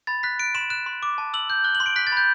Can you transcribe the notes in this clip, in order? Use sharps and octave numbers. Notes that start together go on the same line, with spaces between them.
B5 A6
F#6 B6
F#6 D7
C6 E7
F#6 E7
C6
D6
A5
E6 F#7
G6
F#6 G7
F#7
C6
D7
F#6 B6
A6
B5
G6